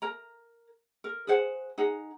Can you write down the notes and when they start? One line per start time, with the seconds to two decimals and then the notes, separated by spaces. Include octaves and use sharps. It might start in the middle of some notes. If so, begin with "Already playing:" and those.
0.02 A#4 A#5
1.04 A#4
1.27 G#4 B4 C5 F#5
1.78 D#4 G#4 F#5 A#5